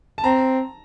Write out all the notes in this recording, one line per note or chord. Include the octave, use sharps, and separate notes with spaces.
A5
C4 A#5